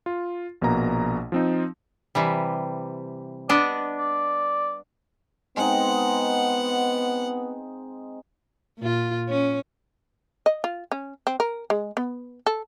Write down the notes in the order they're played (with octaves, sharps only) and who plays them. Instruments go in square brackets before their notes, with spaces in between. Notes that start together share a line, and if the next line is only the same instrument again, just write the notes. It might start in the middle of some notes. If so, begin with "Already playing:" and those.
[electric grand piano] F4
A#1 B2 A#3 A#5
F3 C4 D#4
[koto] C3 E3 G3
[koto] B3 D4 D#5 [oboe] D5
[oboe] D5
[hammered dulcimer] G#3 C4 D#4 [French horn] B3 [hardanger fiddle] F#5
[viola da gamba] A#2 F4
C#4
[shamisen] D#5
F4
C#4
C4
A#4
G#3
B3
A4